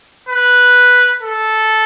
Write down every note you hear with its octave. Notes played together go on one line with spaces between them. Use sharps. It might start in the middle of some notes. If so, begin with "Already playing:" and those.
B4
A4